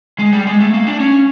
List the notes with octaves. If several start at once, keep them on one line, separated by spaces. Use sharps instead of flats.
G#3
G3
G#3
A3
A#3
D4
C#4